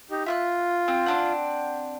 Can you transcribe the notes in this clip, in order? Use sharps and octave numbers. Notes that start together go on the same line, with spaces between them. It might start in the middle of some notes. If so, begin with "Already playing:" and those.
D#4 G4
F4 E5 F6 F#6
C4
C4 D4 F#5